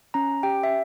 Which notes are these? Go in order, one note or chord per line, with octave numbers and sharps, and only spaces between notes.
C#4 A#5
G4 G5
E5